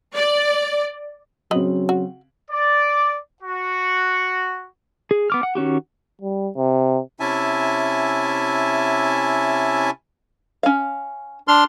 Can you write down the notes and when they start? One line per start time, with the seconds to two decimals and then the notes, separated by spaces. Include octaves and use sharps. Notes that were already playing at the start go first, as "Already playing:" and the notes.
0.15 D5
1.51 C#3 F#3 B3 C4 D#5 F#7
1.89 F#4
2.51 D5
3.42 F#4
5.11 G#4
5.30 B3 D6 F6
5.43 F#5
5.55 D#3 C#4 F#4 G4
6.21 G3
6.57 C3
7.20 C3 C#4 E4 E5 G#5 A5
10.63 C#4 F5
11.48 D4 C6 F6